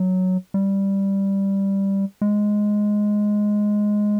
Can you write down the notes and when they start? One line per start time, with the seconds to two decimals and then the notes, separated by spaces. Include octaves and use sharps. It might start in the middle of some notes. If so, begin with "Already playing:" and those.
Already playing: F#3
0.54 G3
2.21 G#3